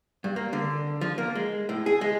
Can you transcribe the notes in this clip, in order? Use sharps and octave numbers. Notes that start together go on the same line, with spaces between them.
G2
A#3
D3
F3
A#3
G#3
A2
G#4
G#3